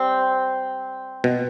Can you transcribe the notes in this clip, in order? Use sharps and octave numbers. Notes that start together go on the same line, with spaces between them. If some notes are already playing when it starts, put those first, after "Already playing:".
Already playing: G3 C4
B2